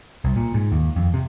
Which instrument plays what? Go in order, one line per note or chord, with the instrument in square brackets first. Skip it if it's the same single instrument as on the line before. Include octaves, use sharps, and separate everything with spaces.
[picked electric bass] C2
A#2
G#2
D#2
F2
C3